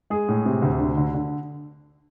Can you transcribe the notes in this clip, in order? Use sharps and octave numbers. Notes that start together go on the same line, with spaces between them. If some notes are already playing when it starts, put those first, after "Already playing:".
G#3 G#4
A2
C3
D2
D3
D3
D3